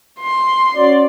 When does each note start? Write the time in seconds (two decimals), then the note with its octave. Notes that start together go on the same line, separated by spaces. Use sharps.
0.20 C6
0.75 C#4 F#4 D5